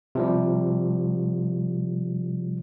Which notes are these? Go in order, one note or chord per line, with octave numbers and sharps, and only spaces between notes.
C3 F3 G3